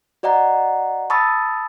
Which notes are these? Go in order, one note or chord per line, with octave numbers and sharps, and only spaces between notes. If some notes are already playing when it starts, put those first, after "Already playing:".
F#4 D5 D#5 F#5 A#5
A5 B5 C#6 D#6 E6 A6